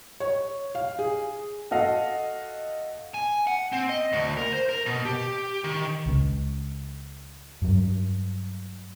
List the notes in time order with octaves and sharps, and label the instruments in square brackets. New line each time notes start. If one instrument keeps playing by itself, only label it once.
[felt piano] C#5
F5
G#4
[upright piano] F#4 A4 D#5 F5
[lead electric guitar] G#5
F#5
C4
D#5
D2
A#4
C5
A#4
B2
G4
D#3
[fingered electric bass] C#2 C#3
G2 F#3